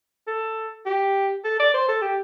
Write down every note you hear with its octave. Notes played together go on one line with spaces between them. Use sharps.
A4
G4
A4
D5
C5
A4
G4